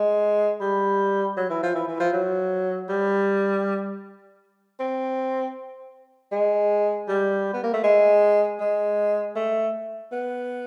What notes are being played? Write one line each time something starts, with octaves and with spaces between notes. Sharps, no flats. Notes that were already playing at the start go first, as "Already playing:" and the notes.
Already playing: G#3
G3
F#3
E3
F3
E3
E3
F3
F#3
G3
C4
G#3
G3
B3
A#3
A3
G#3
G#3
A3
B3